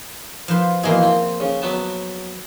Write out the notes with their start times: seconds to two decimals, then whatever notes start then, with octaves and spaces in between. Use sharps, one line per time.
0.48 F3 B4 C6
0.83 B2 E3 F3 A#3 G#4 C6
1.03 C4
1.40 C#3
1.62 F#3 B3 A5